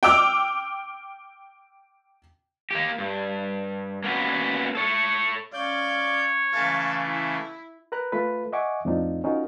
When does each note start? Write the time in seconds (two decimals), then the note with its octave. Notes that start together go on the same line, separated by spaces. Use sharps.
0.03 G5 D6 E6 F6
2.71 A#3 G4
2.98 G2
4.04 A#3 B3 C#4 F#4 B4
4.75 A4 C#5
5.53 C#4 C#5 D5 F5 G6
6.53 C#3 E3 A3 F5 A5
7.07 E4
7.92 A#4 B4 A#5 F#6
8.12 A3 F4 A4 B4
8.53 D#5 E5 F#5 G#5 C#6 D6
8.85 F2 A2 C4 D4 D#4 F4
9.24 C#4 D#4 F4 F#4 A#4